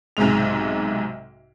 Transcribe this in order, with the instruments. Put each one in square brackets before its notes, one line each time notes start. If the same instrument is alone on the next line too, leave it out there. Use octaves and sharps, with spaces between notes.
[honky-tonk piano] B1 G#2 C3 G#3 F7